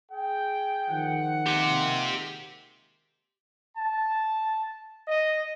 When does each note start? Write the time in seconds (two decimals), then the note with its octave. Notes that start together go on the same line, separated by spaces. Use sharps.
0.11 G#4 G5
0.88 D#3 F3 F#5
1.47 G#3 A#3 G4 C6
3.76 A5
5.07 D#5